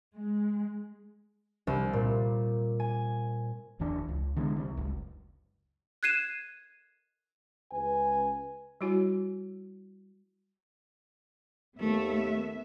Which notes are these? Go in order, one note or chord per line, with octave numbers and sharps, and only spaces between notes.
G#3
C2
A#2
G#5
F#1 E2 E3 D4
C#2
D3 E3 G#3 B3
C2
F#1 C#2
F#6 G#6 C7 D#7 E7
C#2 B4 G#5
G3 E4 F#4 C#5 G#5
D#2 A3 B3 E5